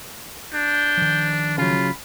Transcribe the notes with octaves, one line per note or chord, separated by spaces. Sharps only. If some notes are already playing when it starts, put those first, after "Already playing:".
D4 G6
D#3 F3
C#3 F#3 F4 B5